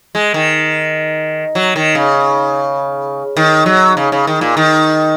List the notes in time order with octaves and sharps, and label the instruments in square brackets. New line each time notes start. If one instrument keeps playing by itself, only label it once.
[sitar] G#3
D#3
F#3
D#3
C#3
D#3
F#3
C#3
C#3
D#3
A#2
D#3